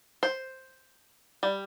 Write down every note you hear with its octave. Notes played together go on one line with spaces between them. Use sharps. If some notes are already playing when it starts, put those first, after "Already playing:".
C5
G3